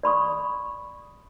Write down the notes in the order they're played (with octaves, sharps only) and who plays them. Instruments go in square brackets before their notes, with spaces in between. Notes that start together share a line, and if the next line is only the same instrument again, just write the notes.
[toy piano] D5 B5 C#6 D#6